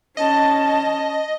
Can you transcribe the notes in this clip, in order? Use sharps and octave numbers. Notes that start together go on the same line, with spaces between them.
C#4 D#5 A5